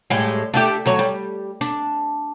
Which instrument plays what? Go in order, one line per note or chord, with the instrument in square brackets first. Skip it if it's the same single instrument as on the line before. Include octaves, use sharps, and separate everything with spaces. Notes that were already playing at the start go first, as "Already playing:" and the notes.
[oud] A2 G3 G#3
A3 D4 G4
D2 F#3 C#5
G3
D4